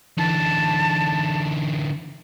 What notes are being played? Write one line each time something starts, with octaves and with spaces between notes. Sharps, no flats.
D3 E3 A5